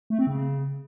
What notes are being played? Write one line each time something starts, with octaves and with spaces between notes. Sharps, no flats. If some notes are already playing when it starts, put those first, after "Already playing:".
A3
C4
C#3